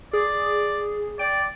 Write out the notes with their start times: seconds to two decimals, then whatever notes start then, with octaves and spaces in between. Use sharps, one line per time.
0.13 G#4 D5
1.19 D5 G5